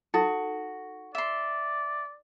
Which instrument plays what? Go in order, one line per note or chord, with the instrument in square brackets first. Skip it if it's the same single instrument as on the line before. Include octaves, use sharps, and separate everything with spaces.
[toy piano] D#4 A4 [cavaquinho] F#4
[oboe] D5 [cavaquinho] E5 C6